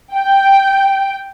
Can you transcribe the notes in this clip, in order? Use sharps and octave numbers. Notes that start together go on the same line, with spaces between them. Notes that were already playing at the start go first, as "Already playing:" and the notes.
G5